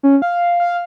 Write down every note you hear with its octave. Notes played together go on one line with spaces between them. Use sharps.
C#4
F5
F5